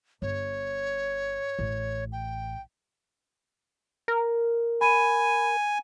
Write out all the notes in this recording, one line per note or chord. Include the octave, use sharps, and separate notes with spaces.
G1 C#5
A1
G5
A#4
G#5 B5 D#7